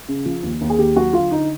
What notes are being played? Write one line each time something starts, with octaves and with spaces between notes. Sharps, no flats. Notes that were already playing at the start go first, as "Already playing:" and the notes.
C#3
F3
D#2
D#2
G#4
D#2 G4
F#3 F#4
D3 F4
D3 D#4